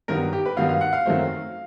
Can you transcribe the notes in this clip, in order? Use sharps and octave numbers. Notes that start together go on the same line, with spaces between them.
G2 D#3 F#3 B3 A#4
G4
B4
G2 D#3 F#3 B3 F5
F5
F#5
F5
F#2 D#3 F#3 A3 C4